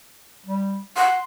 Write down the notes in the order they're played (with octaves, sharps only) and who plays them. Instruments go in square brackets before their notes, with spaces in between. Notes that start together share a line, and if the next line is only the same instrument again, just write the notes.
[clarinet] G3
[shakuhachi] F#5 [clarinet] C6